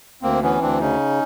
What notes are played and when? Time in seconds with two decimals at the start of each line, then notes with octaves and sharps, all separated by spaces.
0.22 D2 A#3 C4
0.42 E3 B3 C#4
0.61 D2 C4 D4
0.80 C#3 C#4 D#4